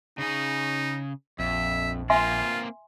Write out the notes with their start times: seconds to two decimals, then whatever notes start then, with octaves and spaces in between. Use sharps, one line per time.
0.18 C#3 D#4 G#4
1.39 A#1 F2 E5
2.10 A#3 C4 F4 E5 G#5 C6